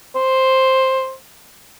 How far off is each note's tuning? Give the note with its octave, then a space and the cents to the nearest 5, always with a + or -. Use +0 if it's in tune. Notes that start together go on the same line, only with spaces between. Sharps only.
C5 +5